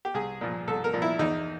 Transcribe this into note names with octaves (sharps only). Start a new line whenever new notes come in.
G4
C2 G#4
A#2 F3
C2 A4
A#4
A#2 F3
E4
E2 D#4